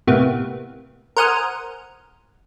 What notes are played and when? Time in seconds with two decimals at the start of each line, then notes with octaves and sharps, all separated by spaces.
0.07 A2 C3 A#3 B3
1.17 A#4 C5 F#5 G#5 D#6 F6